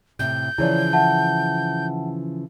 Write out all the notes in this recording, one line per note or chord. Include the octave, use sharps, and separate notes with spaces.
A2 C3 G6
C#3 E3 F3 E4 C#5 D5
E5 F#5 A5